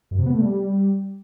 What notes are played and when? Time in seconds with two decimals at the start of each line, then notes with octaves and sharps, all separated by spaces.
0.11 F#2
0.19 C3
0.26 B3
0.34 A3
0.42 G3